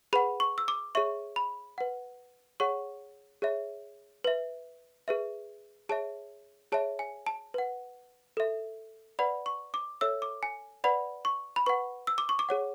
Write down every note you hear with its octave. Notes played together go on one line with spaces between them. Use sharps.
G#4 B4 F#5 B5
C#6
E6
D6
G#4 C#5 E5 C#6
B5
B4 F#5
G#4 C#5 F#5 C#6
G#4 C#5 E5
B4 E5
G#4 B4 E5
G#4 C#5 E5 A5
G#4 C#5 E5 A5
G#5
A5
B4 F#5
A4 E5
B4 D5 F#5 B5
C#6
D6
A4 C#5 E5 E6
D6
G#5
B4 D5 F#5 B5
C#6
B5
B4 F#5 C#6
E6
D6
C#6
D6
G#4 C#5 F#5